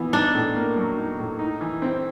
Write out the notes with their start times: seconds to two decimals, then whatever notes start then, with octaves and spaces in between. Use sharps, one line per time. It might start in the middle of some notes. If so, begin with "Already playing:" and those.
Already playing: E3 B3
0.13 D4 D#4
0.35 A2
0.56 A#3
0.77 F#3
0.97 D#4
1.19 A2
1.39 D#4
1.61 E3
1.82 C4